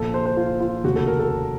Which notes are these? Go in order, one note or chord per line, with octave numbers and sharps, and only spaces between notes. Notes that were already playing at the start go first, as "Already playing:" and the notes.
Already playing: A#1 A#2 A4
C5
C5
F4
F4
F1 D#2 C#3 F#4
A4
A#4
A4